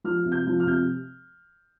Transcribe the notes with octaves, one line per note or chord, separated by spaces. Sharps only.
F3 F6
C3
G6
F3
F6
C3 G6